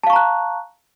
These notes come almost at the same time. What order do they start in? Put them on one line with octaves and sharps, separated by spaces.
A5 F5 C#6 A#5 F#6